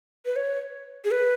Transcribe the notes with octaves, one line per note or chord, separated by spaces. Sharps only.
B4
C#5
G#4
B4